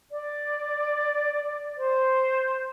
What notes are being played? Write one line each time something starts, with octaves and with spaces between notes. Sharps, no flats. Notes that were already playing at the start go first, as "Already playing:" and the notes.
D5
C5